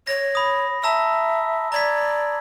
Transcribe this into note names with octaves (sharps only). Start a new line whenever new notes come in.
C#5 A#6
B5 D#6
E5 A5 A#5 E6
D5 A#5 G#6 B6